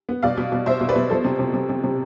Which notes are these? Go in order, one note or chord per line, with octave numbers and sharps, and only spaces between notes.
B3
B2 D5 F5
B2
B2
B2 C5 E5
B2
B4 D5
B2
F3 A4 C5
C3
C3
C3
C3
C3